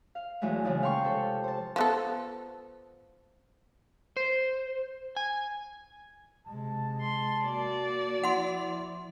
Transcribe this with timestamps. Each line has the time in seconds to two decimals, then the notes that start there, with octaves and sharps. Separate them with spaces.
0.15 F5
0.41 E2 E3 F#3 G#3 A3
0.64 A#2 C#3 E3 F3 G#3
0.82 F5 G5 A5 C6 C#6
1.04 C3 A4
1.44 C5 A5
1.76 F3 B3 A4
4.17 C5
5.17 G#5
6.47 C3 G#3 A5
7.01 C6
7.45 A#3 F#4 D5
8.24 F3 E4 F#5 C6